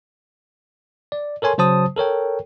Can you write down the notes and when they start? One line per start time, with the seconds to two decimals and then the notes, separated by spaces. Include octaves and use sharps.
1.12 D5
1.42 A4 A#4 C#5 G#5 C6
1.58 C#3 F#3 C5 A5 D#6
1.96 A4 A#4 C#5 G5